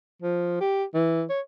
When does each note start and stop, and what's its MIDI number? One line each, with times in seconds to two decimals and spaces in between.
0.22 0.60 53
0.61 0.84 67
0.94 1.24 52
1.30 1.41 73